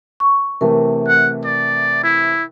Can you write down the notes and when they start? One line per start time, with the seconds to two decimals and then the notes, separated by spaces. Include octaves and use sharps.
0.20 C#6
0.61 C3 E3 A3 A#4
1.08 F#5
1.45 D5
2.04 E4